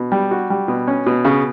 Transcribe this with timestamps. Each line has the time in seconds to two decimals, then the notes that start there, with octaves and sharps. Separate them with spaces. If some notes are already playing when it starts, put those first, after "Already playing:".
Already playing: B2
0.12 G3
0.31 F#4
0.50 G3
0.68 B2
0.87 C#4
1.06 B2
1.25 C#3